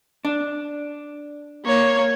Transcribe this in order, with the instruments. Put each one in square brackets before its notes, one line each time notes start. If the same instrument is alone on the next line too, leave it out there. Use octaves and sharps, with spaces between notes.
[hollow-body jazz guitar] D4
[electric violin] A#3 C#5